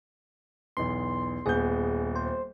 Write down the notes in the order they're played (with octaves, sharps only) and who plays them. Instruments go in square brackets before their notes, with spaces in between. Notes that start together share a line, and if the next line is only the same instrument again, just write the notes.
[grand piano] B1 E2 [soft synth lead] C6
[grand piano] D#1 B3 G6 [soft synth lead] G#4
[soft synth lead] C5